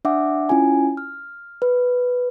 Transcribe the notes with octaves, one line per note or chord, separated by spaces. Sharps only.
D4 E5 F#5 D6
C#4 E4 F4 G#5
F6
B4